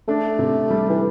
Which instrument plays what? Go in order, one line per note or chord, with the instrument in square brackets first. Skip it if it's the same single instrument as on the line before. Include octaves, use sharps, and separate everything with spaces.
[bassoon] A3 [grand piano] D4
[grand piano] C3
G3
[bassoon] E3